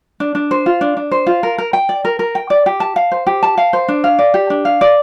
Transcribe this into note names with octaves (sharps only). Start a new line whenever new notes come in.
D4
D4
C5
F4
D4
D4
C5
F4
A#4
A#4
G5
D5
A#4
A#4
G5
D5
G4
A5
F5
C5
G4
A5
F5
C5
D4
F5
D5
G4
D4
F5
D5